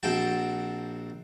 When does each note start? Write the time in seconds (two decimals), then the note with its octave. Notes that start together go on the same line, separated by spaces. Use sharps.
0.03 A#1 C4 F#4 G5 A5